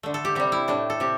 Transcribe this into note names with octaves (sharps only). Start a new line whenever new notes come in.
D3 A3
A4
G4
C3 G3 G4
E4
A2 A3 D4
A4
C3 G4